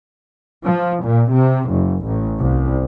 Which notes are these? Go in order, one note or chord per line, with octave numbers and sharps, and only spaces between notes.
F3
A#2
C3
F#1
A1
C2